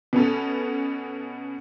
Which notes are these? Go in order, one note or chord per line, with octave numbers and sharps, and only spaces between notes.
B2 B3 C#4 A4